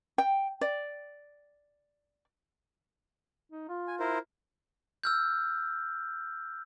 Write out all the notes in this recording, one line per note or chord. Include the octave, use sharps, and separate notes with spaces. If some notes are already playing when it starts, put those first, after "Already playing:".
G5
D5
D#4
F4
G#5
E4 A#4 C5
E6 F6 G6